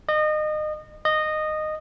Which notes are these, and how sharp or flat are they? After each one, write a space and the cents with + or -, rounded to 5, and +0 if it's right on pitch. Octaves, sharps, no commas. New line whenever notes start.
D#5 -30
D#5 -15